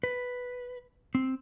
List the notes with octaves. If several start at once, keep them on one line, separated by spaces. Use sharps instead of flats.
B4
C4